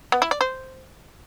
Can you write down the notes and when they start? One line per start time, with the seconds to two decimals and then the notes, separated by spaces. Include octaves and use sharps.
0.12 B3
0.22 E4
0.31 D5
0.41 C5